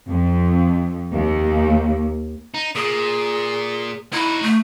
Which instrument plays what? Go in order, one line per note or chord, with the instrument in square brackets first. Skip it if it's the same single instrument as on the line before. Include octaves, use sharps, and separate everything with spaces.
[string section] F2
D#2
[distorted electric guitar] D#4
[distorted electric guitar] A#2 [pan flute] G#4
[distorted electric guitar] D#4 F#4 [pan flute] E4
[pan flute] A3